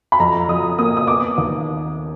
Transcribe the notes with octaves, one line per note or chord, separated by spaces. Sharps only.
B5
F2 A#5
F2 D#6
A#3 D#6
D#6
B3 D6
D#2